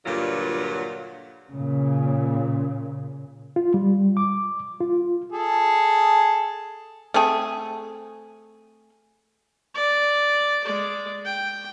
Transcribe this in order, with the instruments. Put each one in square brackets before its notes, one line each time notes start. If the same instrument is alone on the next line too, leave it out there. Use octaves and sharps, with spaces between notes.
[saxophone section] G2 A#2 D3 F#3 F4
[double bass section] A#2 C#3
[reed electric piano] F4
G3
D6
F4
[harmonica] G#4 A4
[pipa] A3 C4 G#4
[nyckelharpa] D5
G#3 D5
G5